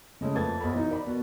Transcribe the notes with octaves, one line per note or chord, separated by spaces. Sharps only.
C#3 G#3 A3 C#4
F2 A3 A#3 B4 G#6 A6
B1 C5 B5
E3 D#4
A#4 D5 B5
B2 F#4